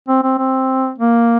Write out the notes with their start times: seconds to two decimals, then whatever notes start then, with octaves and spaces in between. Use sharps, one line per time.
0.08 C4
0.23 C4
0.38 C4
0.98 A#3